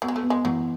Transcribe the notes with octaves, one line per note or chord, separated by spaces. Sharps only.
F#3 B3
G#3
A3
B3
G#3
E3 F#3